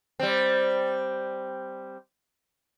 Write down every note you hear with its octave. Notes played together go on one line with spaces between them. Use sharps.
G3 C4